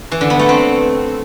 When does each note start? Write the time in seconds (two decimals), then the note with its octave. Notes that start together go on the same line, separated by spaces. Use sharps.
0.12 E3
0.21 D3
0.30 B3
0.39 A3
0.49 C4